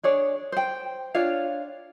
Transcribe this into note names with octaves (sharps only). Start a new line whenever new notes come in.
D4 G#4 C#5 D5
C5 G5
D4 F4 C#5 F5